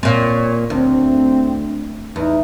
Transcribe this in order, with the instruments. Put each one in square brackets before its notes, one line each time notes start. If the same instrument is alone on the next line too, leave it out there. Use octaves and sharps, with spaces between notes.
[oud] A#2 C4 [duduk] C#5
[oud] D2 [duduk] C4
[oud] E2 [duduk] D#4